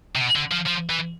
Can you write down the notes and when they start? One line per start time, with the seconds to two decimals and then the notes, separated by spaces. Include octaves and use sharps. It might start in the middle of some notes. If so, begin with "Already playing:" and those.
0.16 C3
0.21 B2
0.36 D3
0.52 F3
0.66 F3
0.90 E3